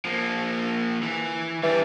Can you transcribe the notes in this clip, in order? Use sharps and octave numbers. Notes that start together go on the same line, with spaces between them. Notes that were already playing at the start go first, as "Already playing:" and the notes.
F3 A#3
E3
E3 G3 D4